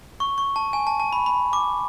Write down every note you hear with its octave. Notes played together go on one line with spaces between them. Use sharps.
C#6
C#6
A5
G#5
A5
A5
B5
B5
D6